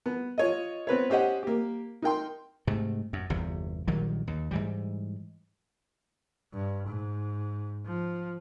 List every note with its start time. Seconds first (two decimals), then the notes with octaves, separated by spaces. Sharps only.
0.06 B3
0.38 F4 C#5 D#5
0.87 B3 C4 B4 C#5
1.10 C#4 G4 C5 D#5 F#5
1.43 A#3 G4
2.02 D#4 A#4 G5 C6
2.67 G#2 C3 A3
3.13 F#2
3.30 G1 E2 C3
3.88 A#1 D#3 F#3 G3
4.27 D#2
4.51 G#2 E3 G3
6.53 G2
6.87 G#2
7.87 F3